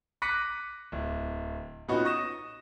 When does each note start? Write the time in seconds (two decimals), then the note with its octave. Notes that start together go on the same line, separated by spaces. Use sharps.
0.22 D6 F#6 A#6 B6 C#7 D#7
0.92 D1
1.88 A#2 B3 C#4 D#4 F#4
2.05 C#6 D#6 A#6 E7